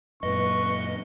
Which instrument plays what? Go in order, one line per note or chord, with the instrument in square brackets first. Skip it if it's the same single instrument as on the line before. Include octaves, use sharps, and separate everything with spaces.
[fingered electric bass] F#2 A#2 [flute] B4 [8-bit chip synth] D#5 [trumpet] C#6